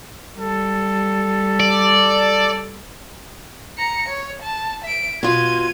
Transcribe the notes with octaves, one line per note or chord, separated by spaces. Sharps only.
G3 A4
D5
A#5 C#7
C#5
A5
E5 D7
B2 F4 G#6 D#7